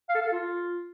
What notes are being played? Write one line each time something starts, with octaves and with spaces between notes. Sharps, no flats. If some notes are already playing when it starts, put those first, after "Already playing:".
F5
A4
F5
A4
F4